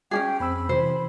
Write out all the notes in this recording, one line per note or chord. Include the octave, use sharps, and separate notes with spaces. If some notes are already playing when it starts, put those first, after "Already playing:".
C#4 D4 G#4 G5
F2 C4 B5 E6
C3 E3 C5